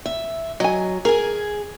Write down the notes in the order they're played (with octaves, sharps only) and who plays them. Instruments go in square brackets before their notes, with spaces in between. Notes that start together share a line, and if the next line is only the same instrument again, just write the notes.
[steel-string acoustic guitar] E5
[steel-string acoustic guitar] F#3 [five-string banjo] D#5 G#5
[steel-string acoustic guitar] G#4 G#5 [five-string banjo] A#4